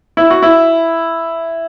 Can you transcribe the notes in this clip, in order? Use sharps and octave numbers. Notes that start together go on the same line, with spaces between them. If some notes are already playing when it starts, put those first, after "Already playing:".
E4
F#4
E4